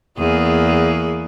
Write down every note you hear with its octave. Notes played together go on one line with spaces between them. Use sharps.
E2 A#3 G#4